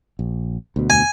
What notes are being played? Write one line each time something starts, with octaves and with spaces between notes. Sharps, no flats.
A#1
D2 B2
G#5